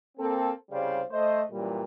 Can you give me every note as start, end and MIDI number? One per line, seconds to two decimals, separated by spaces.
0.18 0.51 58
0.18 0.51 60
0.18 0.51 69
0.71 1.02 36
0.71 1.02 49
0.71 1.02 55
0.71 1.02 72
0.71 1.02 74
0.71 1.02 77
1.11 1.42 57
1.11 1.42 72
1.11 1.42 75
1.51 1.84 42
1.51 1.84 46
1.51 1.84 52
1.51 1.84 55